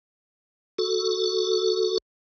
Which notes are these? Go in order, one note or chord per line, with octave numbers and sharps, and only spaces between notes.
F#4 A4